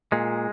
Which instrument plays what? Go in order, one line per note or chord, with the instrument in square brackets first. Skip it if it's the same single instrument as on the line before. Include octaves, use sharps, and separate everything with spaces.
[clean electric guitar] A#2 G#3